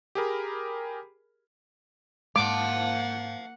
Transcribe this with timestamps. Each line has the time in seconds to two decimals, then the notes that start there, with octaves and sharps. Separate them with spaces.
0.15 G4 G#4 A#4 B5
2.36 G#2 G#3 A#3 F5 F#5 A5 D6